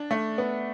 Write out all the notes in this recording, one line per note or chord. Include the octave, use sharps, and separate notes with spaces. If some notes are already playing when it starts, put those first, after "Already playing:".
Already playing: D4
A3
B3